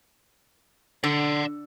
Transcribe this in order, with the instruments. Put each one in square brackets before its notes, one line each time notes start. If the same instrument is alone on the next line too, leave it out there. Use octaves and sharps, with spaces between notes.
[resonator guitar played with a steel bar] D3 [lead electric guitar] D5 F#5